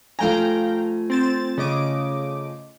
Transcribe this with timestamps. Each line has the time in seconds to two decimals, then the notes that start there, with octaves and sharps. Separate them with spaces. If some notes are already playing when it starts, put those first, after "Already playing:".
0.19 F3 A3 F5 G5 G#5 A#5
1.10 C4 A6 E7
1.58 C#3 D#5 D6